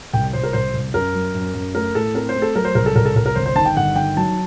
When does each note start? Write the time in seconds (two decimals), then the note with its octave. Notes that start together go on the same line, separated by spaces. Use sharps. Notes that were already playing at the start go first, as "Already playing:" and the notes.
0.13 C2 G5
0.33 C2 C5
0.43 A#4
0.53 C2 C5
0.74 C2
0.94 F#2 A#4
1.15 F#3
1.34 F#2
1.54 F#2
1.75 A3 A#4
1.95 A2 A4
2.15 C4 A#4
2.29 C5
2.35 A3
2.42 A4
2.55 F#3 A#4
2.65 C5
2.75 C2 A#4
2.86 A4
2.95 C2 A#4
3.05 A4
3.15 C2 A#4
3.26 A#4
3.36 G1 C5
3.46 C5
3.55 D#3 A5
3.66 G5
3.77 G1 F#5
3.96 D#3 G5
4.17 F#3 A5